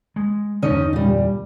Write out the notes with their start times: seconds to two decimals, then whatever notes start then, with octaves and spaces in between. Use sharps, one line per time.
0.16 G#3
0.62 E2 G2 D3 C#4 D#4 D#5
0.93 A#2 G3